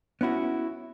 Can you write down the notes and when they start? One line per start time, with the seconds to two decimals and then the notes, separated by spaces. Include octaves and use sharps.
0.21 B3 C#4 E4 F#4